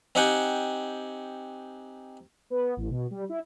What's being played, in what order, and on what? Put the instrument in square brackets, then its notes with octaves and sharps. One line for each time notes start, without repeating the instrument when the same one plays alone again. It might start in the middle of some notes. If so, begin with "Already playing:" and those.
[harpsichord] C4 D#4 G4 F#5 G#5
[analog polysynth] B3
A1
B2
G3
E4